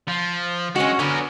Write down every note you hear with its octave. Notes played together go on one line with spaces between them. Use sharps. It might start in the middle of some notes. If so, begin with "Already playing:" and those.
F3
G#3 C#4 F#4
D3 B3 C#4 A#4